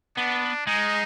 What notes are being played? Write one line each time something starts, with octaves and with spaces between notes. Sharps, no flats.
B3 D4
G#3 D#4